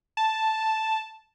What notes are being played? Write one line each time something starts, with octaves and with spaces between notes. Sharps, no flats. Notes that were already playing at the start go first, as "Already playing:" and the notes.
A5